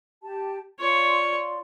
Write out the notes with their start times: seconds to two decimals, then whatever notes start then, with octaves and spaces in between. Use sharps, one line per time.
0.23 G4 A5
0.80 F4 C#5 D5 C6